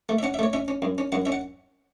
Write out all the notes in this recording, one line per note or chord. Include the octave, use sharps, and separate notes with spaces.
A3
E5
C#4 F#5
E5
A3 C#5
C#4 E5
C#4
F#2
C#4
F#2 F#5
C#4 E5
F#5